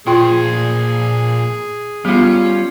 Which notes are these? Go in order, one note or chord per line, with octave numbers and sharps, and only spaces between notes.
A#2 F4 G#4 C5 G5 C6
G3 B3 C#4 F4